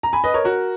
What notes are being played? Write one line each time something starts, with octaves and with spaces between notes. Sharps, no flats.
A#5
G#5 B5
B4 D#5
A#4 C#5
F#4 A#4